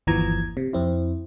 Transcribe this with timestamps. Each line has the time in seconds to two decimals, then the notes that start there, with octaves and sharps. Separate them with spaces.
0.07 G1 D#2 E3 F3 A#5 G#6
0.57 C3
0.73 F2 C4 E4